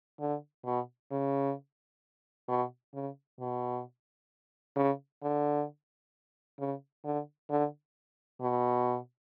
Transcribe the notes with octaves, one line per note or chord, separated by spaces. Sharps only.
D3
B2
C#3
B2
C#3
B2
C#3
D3
C#3
D3
D3
B2